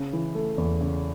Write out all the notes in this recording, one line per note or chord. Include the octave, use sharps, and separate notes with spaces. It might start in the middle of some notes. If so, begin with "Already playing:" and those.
Already playing: C#3
E3
A3
E2
C#3